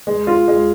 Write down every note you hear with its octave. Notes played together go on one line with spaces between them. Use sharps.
G#3
F4
G#3